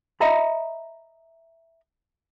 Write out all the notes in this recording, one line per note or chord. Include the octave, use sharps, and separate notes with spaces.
D#5 E5 A#5 B5